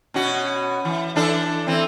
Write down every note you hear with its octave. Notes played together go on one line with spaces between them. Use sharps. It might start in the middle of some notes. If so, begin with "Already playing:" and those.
B2 C#4 F#4
E3
E3 D4 A4
E3 C4